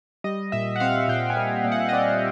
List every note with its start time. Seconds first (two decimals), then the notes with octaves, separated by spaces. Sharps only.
0.24 G3 D#5
0.52 A#2 E5
0.76 F#5
0.80 C4 F5
1.08 A#2 G5
1.30 G#5
1.37 G3
1.64 A#2
1.72 F#5
1.89 D#5
1.92 C4 D5